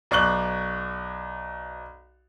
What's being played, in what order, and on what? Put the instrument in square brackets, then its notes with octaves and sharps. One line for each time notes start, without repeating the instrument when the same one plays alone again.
[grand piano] B1 D5 C#6 F#6 F#7